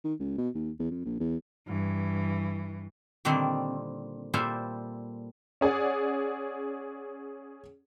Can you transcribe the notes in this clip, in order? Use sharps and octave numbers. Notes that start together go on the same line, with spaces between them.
D#3
C#2
B2
D#2
E2
F2
A#1
E2
G2 E3
A#2 D3 D#3 G3 A#3 C4
A#2 G3 E4 A4 C5 F5
C#4 G#4 D5 F#5